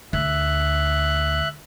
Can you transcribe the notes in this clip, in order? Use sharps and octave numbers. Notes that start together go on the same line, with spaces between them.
D2 E5 F#6